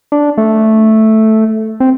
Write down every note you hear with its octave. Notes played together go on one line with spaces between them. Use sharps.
D4
A3
C4